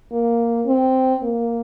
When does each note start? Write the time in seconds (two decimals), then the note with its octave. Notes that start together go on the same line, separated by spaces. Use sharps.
0.12 A#3
0.67 C4
1.23 A#3